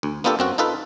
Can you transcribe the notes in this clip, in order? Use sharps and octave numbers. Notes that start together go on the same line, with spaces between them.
D2
A#3 B3 D4 F4 G4 A4
F#2 C4 F#4
D#4 F4 A4 B4